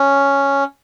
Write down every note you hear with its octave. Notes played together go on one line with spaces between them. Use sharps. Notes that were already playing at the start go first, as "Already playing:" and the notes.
Already playing: C#4